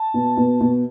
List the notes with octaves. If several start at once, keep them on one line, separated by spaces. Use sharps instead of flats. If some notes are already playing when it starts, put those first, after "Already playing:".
Already playing: A5
B2
B2
B2